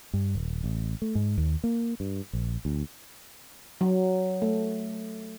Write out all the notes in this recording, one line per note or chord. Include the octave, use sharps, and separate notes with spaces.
G2
D#1
A1
A3
G#2
D#2
A#3
G2
A#1
D2
F#3
A3